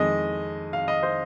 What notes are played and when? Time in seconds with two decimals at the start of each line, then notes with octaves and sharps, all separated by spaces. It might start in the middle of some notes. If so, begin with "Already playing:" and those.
Already playing: F2 D#3 G#3 D#5
0.73 F5
0.88 D#5
1.03 C5